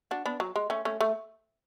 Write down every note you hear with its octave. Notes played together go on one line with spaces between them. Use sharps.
D4 F#4
B3 D4
F#3
G#3
A3 C#4
A3 C#4
A3